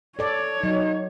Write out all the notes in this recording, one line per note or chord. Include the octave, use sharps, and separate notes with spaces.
A4 C#5 D5
F#3 D#4